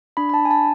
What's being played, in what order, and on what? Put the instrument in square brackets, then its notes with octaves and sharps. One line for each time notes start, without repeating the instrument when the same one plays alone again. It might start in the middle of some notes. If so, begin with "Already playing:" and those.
[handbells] D4 B5
B5
A5
D4
G#5
A5